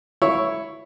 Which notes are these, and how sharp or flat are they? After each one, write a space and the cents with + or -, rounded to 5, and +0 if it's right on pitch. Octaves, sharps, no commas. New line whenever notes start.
E4 +0 C#5 +0